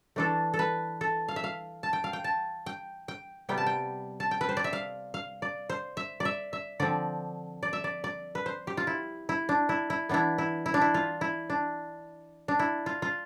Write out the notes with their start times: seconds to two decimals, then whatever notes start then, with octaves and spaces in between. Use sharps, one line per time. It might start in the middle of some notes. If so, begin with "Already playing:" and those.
0.16 E3 A3 D4 A4
0.54 A4
0.59 B4
1.01 A4
1.28 F5
1.36 E5
1.44 F5
1.83 A5
1.93 G5
2.04 F5
2.13 G5
2.24 A5
2.66 G5
3.08 G5
3.49 C3 G3 B3 G5
3.58 A5
3.66 G5
4.20 A5
4.31 G5
4.41 B4
4.49 C5
4.57 D5
4.64 E5
4.73 F5
5.14 F5
5.42 D5
5.69 C5
5.97 E5
6.20 D5
6.25 E5
6.53 E5
6.80 D3 F3 C4 D5
7.63 D5
7.73 E5
7.84 D5
8.04 D5
8.35 B4
8.46 C5
8.67 G4
8.77 F4
8.87 E4
9.29 E4
9.49 D4
9.69 E4
9.90 E4
10.09 E3 B3 D4 E4
10.38 E4
10.66 E4
10.74 D4
10.82 E4
10.94 F4
11.21 E4
11.50 D4
12.48 D4
12.59 E4
12.86 F4
13.02 F4